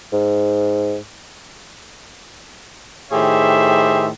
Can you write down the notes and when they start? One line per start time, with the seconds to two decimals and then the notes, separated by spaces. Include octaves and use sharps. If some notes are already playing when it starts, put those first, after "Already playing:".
0.13 G#2
3.11 A2 D#3 G4 G#4 C5 E5